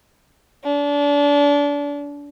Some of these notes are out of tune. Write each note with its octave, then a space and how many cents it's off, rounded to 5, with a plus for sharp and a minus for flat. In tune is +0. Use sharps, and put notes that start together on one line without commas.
D4 -30